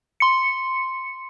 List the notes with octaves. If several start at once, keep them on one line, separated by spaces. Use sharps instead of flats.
C6 C#7